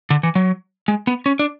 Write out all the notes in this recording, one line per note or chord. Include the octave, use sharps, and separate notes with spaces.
D3
E3
F#3
G#3
B3
C#4
D4